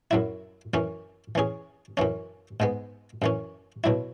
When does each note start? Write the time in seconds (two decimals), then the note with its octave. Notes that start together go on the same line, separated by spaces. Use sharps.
0.11 F#2 F#3 E4
0.74 F#2 E3 C#4
1.35 E3 C#4 G#4
1.97 F#2 E3 C#4
2.60 G#2 G#3 B3
3.22 F#2 E3 C#4
3.84 B2 F#3 E4